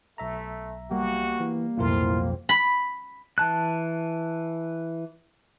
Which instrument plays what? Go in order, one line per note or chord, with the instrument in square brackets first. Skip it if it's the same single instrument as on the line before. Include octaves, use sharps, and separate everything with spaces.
[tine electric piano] B1 E5 A#5 [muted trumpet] A3
[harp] G3 B3 [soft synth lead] A#3 [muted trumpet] F#4
[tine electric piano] E3
[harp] B1 F2 [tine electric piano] A2 E4 A#4 [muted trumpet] F4
[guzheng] B5
[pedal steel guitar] E3 A5 F#6